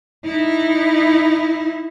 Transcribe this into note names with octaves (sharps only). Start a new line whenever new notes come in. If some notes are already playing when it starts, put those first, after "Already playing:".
D#4 E4